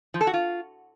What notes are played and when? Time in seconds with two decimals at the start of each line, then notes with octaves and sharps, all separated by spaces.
0.14 F3
0.21 A4
0.27 F#4
0.34 F4